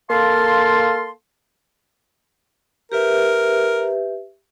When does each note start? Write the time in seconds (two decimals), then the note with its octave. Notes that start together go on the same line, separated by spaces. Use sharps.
0.11 A#3 A4 F5 A5 C6
2.92 G4 A#4 B4 E5